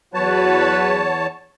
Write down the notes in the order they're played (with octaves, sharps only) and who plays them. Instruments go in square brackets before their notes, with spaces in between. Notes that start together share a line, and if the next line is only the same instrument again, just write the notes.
[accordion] E2 C#5 A5 [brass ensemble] F#3 F#4 B4